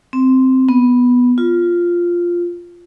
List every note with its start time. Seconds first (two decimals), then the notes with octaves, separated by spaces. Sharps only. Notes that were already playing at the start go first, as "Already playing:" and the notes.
0.13 C4
0.69 B3
1.38 F4